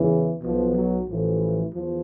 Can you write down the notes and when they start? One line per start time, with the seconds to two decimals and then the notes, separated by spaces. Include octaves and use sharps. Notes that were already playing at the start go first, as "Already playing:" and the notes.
Already playing: E2 C#3 E3
0.43 B1 B2 F3
0.75 F#3
1.08 A1 A2 E3 F3
1.73 E2 F3